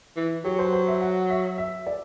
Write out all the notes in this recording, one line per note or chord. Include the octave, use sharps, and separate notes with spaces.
E3
F#3 G4
C5
C5
E5
F#5
E5
E5
D5